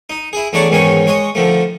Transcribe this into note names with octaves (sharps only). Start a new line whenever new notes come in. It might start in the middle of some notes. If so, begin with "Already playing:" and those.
D#4
E4 G#4
E2 A3 D4 C#5 D5 A#5
E2 G#2 D#3 C#4 D#4 C#5
G#3 C#5 D#5
D3 D#3 F3 A3